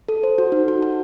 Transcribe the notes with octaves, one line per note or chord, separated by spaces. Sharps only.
A4
C5
F#4
D#4
F#4
F#4